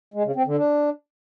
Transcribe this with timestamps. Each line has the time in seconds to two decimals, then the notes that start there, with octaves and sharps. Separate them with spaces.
0.14 G#3
0.25 C#3
0.36 C4
0.46 D3
0.57 D4